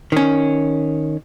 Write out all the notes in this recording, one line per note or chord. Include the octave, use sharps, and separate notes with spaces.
D#3 C#4